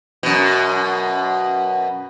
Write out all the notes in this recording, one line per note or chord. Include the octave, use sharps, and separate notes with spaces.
F#2 B2